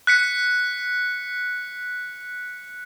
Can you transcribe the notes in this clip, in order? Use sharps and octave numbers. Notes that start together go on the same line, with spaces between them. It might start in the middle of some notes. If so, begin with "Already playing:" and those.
F#6 B6 C#7